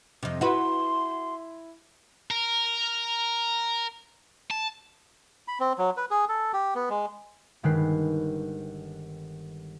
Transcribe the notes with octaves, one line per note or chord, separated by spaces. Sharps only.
F2 C3 D#5
E4 F#4 B4 C6
A#4
A5
B5
C4
F#3
B4
G#4
A4
G4
B3
G#3
G1 D#3 G#3 B4 C7